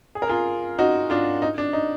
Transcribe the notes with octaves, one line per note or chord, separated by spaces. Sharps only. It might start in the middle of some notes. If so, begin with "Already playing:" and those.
G#4
A#4
F4 G#4
D#4 F#4
D4 F4
D#4
D4
D#4